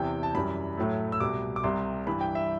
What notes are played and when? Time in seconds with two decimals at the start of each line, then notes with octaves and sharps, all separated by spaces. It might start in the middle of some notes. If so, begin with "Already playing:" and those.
Already playing: E2 C3 E3 G5
0.23 A5
0.35 F#2 E3 G3 B5
0.77 A2 F#3 A3
1.12 E6
1.20 C2 B2 G3 D6
1.56 D6
1.63 C2 C3 G3 C6
2.07 G2 E3 G3 B5
2.21 G5
2.35 E5